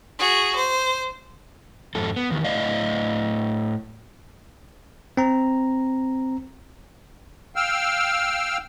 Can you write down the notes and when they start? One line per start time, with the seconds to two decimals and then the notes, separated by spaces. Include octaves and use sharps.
0.19 F#4 G#4
0.55 C5
1.95 F2 G#2 A4
2.16 B3
2.31 E2 D#3 E3
2.44 A2 D5 D#5 F5
5.17 C4 A#5
7.56 F5 G5 E6 F6